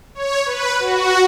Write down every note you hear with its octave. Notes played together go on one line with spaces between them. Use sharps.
C#5
B4
F#4